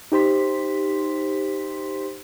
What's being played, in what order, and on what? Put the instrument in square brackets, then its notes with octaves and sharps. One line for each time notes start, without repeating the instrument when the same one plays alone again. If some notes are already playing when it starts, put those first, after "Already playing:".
[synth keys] D#4 G4 C5 C6 B6